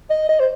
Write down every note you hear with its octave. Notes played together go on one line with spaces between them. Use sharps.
D#5
D#5
C5